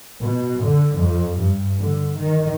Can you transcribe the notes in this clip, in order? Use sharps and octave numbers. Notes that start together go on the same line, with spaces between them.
B2
D3
F2
G2
D3
D#3